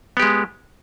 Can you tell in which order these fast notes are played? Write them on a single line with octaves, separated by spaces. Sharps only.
B3 G4 G#3